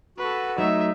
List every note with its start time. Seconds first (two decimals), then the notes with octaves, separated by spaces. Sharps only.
0.18 F#4 A4 B4
0.58 F#3 A3 D#4 E5